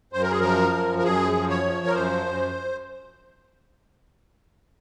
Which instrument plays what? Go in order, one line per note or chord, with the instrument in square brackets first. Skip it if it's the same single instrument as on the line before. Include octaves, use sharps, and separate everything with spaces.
[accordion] F#2 C5
A#4
G#4
F3 A#4
F#2
A#4
F#2 G#4
F3
C#5
F3
A#4
F#2 C5
F#2